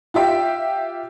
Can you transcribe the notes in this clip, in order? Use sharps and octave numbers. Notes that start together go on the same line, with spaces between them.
F4 G4 E5 G5